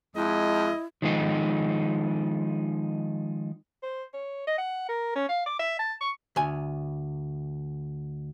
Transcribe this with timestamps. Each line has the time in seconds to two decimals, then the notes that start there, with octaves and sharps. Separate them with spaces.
0.16 F2 G#3 E4 D#5
1.02 D#3 F3 G#3 D#4
3.83 C5
4.14 C#5
4.47 D#5
4.58 F#5
4.89 A#4
5.15 C#4
5.29 F5
5.46 D6
5.59 E5
5.79 A5
6.01 C#6
6.36 D2 G#5